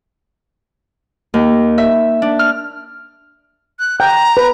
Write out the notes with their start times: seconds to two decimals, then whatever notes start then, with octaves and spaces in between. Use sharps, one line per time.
1.34 D#2
1.78 E5
2.22 D4
2.39 F6
3.79 F#6
4.00 G5 A#5
4.37 B4